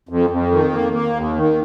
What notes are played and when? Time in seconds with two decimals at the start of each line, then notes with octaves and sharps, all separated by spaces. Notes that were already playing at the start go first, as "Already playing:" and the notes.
0.09 F2
0.30 F2
0.51 D#3
0.72 A#3
0.93 A#3
1.14 D#2
1.35 D#3